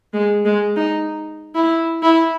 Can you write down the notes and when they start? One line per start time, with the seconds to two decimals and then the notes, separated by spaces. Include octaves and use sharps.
0.13 G#3
0.45 G#3
0.76 D#4
1.55 E4
2.03 E4